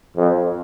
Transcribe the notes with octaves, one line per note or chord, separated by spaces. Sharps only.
F2